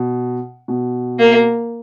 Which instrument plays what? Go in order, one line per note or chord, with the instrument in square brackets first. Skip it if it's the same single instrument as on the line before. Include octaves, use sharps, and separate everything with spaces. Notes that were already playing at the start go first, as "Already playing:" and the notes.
Already playing: [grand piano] B2
B2
[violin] A#3